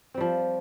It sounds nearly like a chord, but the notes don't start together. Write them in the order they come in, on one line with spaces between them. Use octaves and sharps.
C4 G3 F3